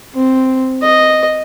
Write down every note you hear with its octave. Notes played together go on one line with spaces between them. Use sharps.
C4
D#5